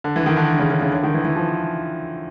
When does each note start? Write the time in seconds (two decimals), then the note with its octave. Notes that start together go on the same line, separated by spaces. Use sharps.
0.04 D3
0.16 E3
0.26 D#3
0.37 D3
0.59 C#3
0.70 D3
0.81 C#3
0.92 D3
1.03 D#3
1.14 E3
1.25 E3
1.36 F3